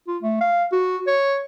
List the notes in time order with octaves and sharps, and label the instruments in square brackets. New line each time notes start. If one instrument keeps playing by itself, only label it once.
[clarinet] F4
A3
F5
F#4
C#5